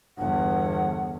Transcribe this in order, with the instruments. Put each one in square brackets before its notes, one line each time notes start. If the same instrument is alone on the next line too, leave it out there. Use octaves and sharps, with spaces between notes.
[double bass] G1 E2 [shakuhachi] F#5